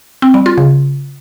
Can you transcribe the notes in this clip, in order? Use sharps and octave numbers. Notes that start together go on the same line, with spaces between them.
C4
G3
F4
C#3